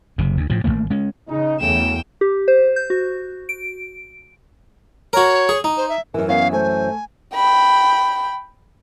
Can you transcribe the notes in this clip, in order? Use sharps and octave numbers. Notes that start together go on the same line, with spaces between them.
F#1 C3
D2
A2 F3
G#1 A2 A3 A#3
G#3 C#4
C#3 D#4
E2 C#3 F#3 A3 G5 E7
G4
C5
G6
F#4
D7
F#4 A#4 C#5
G#4
D#4
C5
E5
F#2 E3 A#4
B3 C#4 F5
A3 C5 G#5
G5 B5